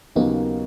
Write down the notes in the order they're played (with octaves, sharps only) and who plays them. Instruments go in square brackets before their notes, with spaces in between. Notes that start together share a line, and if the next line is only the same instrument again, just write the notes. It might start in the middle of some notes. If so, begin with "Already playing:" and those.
[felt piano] D#2 C#3 F#3 A#3 [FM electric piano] B3 D#4